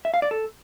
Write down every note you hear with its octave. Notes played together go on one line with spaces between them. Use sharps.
E5
F5
D5
A4